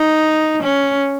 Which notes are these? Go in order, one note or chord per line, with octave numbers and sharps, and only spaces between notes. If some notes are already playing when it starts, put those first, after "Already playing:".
Already playing: D#4
C#4